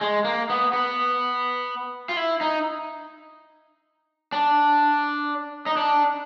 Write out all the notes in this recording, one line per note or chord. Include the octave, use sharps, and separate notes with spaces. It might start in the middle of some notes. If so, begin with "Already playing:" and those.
G#3
A#3
B3
B3
F4
E4
D#4
D4
D#4
D4